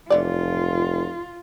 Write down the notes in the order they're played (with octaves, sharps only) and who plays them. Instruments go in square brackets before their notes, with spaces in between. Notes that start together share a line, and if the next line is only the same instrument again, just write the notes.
[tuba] F1 [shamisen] E3 C#5 D5 [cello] F4